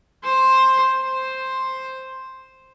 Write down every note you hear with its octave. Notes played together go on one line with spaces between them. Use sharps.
C5
C5